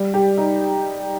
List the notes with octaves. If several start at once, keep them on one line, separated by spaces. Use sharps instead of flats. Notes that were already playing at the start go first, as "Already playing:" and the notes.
Already playing: G3
G4
D#4